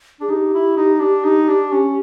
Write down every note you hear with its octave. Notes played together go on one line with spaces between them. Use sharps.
D4 G#4
D#4 G4
E4
D#4
D4
D#4
D4
C#4